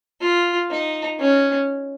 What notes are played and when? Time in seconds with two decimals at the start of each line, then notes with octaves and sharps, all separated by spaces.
0.21 F4
0.70 D#4
1.20 C#4